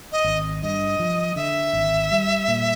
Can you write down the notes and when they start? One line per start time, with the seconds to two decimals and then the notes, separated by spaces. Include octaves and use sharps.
0.12 D#5
0.24 G#1
0.62 G2 D#5
0.99 F3
1.36 D3 E5
1.73 G#1
2.11 G3
2.48 A#2